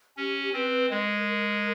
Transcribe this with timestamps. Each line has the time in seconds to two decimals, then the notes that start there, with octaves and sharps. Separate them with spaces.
0.17 C#4 G4
0.54 C4 B4
0.90 G#3 A#4
1.27 A#4